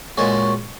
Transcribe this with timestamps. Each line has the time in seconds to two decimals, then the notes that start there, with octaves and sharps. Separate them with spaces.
0.17 A#2 G#3 C#4 F#4